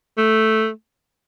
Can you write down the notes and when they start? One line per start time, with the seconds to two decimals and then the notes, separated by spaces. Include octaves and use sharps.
0.18 A3